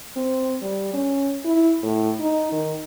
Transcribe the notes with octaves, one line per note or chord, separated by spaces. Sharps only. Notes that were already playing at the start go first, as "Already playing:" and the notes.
C4
G3
C#4
E4
A2
D#4
D#3